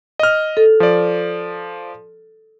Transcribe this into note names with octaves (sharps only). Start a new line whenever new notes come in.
D#5 F6
A4
F3 D5